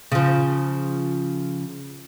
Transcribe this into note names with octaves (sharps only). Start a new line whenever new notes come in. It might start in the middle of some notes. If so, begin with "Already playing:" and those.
C#3 F3